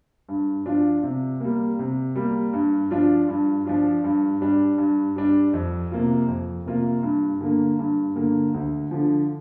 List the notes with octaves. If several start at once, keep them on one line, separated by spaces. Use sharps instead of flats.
G2
F3 D4 F4
C3
G3 A#3
C3
G3 A#3
G2
F3 D4 F4
G2
F3 D4 F4
G2
G3 D4
G2
G3 D4
F2
C3 A#3 F4
F2
C3 A#3 F4
G2
D3 A#3
G2
D3 A#3
D2
D3 F3